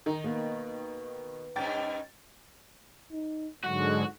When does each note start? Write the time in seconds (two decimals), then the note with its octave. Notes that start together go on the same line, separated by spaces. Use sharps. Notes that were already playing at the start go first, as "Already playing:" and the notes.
0.06 D#3 D#4
0.24 B2 A#3 B3
1.56 G2 C#4 D#4 G5 A6
3.11 D#4
3.64 G#2 D3 F#3 G#3 F#4